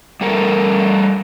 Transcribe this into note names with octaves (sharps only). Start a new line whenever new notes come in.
G3 A4 A#4